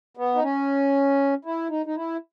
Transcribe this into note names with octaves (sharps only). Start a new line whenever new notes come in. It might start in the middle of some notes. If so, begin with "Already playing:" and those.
B3
D#4
C#4
E4
D#4
D#4
E4